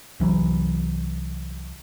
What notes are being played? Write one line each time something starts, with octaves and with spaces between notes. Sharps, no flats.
C2 E3 F#3